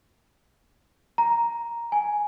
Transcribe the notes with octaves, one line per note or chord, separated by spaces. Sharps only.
A#5
G#5